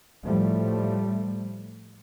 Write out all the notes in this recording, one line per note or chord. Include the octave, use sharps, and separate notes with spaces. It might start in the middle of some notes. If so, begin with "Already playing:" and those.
A2 F3 G3 A3